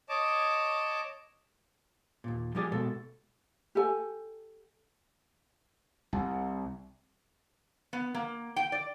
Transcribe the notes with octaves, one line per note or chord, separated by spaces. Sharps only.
C#5 D#5 A5 D6
D#2 A#2
F3 G3 G4 G#4 D5
B2 G#3 A4
G4 A4 G#5
C2
B3
A#3
G5
D5